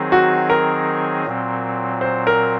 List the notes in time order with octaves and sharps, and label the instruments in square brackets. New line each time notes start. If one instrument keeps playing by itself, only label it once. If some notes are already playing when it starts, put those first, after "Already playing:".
Already playing: [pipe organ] D#3 F#3 C4 D#4 G#4
[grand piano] F#4
A#4
[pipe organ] A#2 F#3 C4
[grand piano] C5
A#4